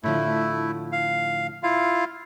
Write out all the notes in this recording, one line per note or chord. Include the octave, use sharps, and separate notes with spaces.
A2 D3 F3 A3 E4
F5
E4 F4 F5